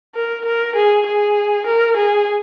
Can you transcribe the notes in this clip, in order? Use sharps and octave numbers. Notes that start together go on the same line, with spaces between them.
A#4
A#4
G#4
G#4
A#4
G#4